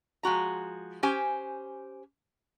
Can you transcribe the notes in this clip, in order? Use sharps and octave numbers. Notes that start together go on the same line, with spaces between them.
F3 G#3 F#4 A#5
C#4 G4 C5 G#5